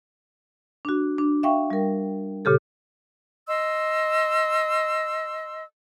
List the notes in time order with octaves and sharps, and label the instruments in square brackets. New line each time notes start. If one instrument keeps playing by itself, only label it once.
[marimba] D4 F#4
D4
E5 F5 G5 C#6
G3 A#4
A#2 C#3 G4 A4
[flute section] D#5 C6 E6